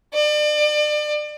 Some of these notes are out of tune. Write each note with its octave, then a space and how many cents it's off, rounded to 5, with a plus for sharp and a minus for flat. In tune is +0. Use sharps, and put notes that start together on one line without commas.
D5 +35